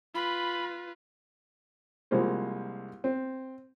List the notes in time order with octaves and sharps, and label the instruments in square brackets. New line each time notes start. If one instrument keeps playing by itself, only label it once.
[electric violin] F4 B4 [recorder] B5
[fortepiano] C2 F3 G#3 A#3 C5
C4